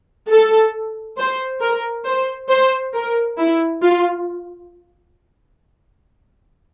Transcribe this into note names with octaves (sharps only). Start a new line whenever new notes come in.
A4
C5
A#4
C5
C5
A#4
E4
F4